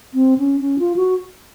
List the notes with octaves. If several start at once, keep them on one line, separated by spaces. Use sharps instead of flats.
C4
C#4
C#4
F4
F#4